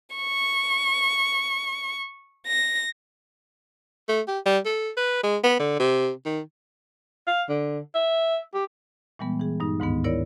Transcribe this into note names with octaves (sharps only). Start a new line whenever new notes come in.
C#6
A#6
A3
G4
G3
A4
B4
G#3
B3
D3
C3
D#3
F5
D3
E5
G4
A#2 E3 G3 G#3 B3
E3 G#4
G2 G#3 D#4
D2 G#2 D#3 B3
E4 A#4 C#5 D5